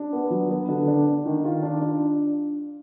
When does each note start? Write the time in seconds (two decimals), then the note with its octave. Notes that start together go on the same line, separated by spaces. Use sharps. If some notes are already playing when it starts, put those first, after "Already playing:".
Already playing: D4
0.13 B3
0.30 F#3
0.50 B3
0.68 D3
0.88 D4
1.06 D4
1.26 D#3
1.44 F4
1.62 D4
1.81 D4